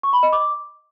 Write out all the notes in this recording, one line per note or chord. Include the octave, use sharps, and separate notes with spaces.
C#6
B5
D#5
D6